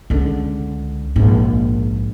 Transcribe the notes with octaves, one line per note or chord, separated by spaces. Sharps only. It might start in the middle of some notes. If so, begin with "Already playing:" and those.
C#2 D3
A#1 G#2